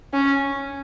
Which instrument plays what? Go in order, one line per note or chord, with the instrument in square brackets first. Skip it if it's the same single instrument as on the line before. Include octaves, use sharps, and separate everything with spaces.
[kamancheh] C#4